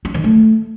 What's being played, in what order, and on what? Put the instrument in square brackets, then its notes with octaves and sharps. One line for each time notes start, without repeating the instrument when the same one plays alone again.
[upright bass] C#4
D#3
A3